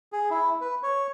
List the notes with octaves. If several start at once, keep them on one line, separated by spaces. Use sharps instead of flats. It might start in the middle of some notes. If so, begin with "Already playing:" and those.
G#4
E4
B4
C#5